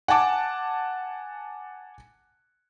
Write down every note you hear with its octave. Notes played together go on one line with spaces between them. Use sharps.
F#5 G#5 A5 D6